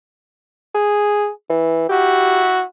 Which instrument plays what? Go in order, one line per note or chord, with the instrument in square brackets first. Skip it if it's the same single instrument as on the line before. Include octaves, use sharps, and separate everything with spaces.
[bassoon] G#4
E3
[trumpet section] E4 F#4 [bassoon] G4